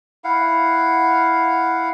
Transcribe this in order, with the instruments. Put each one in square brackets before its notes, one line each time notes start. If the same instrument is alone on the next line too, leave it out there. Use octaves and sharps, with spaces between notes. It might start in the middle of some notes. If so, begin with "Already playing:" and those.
[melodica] E4 F5 F#5